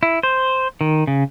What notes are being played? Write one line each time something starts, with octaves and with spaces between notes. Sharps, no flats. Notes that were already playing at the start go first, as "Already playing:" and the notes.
E4
C5
D#3
C#3